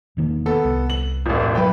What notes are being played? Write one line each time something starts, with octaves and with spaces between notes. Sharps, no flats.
E1 D#3 A#3
B3 A4
C2
F#7
E1 A1
G#1 F#3 B4 G5